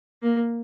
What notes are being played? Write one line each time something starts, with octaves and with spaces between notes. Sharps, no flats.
A#3